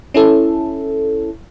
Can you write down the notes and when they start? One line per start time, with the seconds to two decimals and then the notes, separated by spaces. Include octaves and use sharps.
0.14 C#4 E4 A4